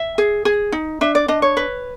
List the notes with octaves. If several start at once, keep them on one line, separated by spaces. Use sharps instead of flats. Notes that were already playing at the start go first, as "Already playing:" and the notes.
Already playing: E5
G#4
G#4
D#4
D4 E5
D5
D4 D#5
C#5
B4